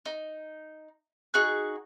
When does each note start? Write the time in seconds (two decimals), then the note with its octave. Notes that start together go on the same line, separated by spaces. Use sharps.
0.05 D#4
1.34 D#4 F#4 G#4 F#6